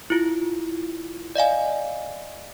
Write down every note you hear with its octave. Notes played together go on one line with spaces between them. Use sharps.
E4 F4
D5 D#5 F5 G#5